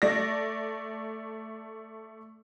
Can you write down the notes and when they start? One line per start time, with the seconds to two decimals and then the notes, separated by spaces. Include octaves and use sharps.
0.02 A3 D5 A#6